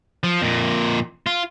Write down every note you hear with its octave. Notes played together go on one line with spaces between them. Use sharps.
F3
F2 A#2
F4